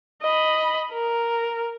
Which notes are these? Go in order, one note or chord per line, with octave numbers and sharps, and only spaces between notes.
D#5 B5
A#4